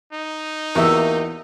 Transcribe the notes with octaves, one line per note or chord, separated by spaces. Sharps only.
D#4
E2 A#3 F#4 G4 E5